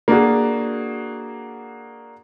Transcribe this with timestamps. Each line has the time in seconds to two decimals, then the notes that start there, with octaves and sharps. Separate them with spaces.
0.08 A#3 D4 F#4 G#4